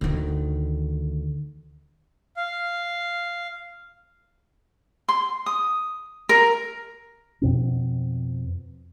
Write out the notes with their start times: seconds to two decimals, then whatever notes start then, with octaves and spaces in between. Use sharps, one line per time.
0.01 D2 D#3
2.37 F5
5.09 C6
5.46 D#6
6.29 A#4
7.42 F2 B2 C4